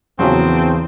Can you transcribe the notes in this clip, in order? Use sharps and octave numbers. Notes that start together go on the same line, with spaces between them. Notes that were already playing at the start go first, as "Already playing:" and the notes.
A#1 E2 C#3 F#3 C4